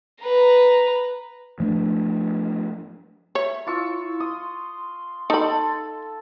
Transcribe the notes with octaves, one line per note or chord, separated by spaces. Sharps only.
B4 A#5
F3 A3 A#3 D4
C#5 E5
E4 F4 C#6 E6
C6 D#6
D#4 A4 B5